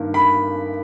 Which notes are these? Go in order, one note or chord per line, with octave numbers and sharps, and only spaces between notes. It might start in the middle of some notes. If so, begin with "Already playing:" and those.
Already playing: G2 D#3 A#3
B5